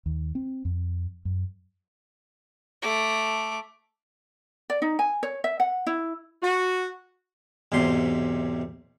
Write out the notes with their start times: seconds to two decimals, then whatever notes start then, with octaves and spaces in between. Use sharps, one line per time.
0.06 D#2
0.35 C4
0.65 F2
1.25 F#2
2.82 A3 D6
4.70 D5
4.82 D#4
4.99 G#5
5.23 C#5
5.44 E5
5.60 F#5
5.87 E4
6.43 F#4
7.72 B1 E2 G#2 C3 C6